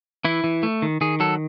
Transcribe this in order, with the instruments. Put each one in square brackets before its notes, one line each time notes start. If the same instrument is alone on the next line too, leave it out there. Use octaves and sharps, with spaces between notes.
[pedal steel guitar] E3 E4
E3
A3
D#3
D#3 G#4
F#3 A4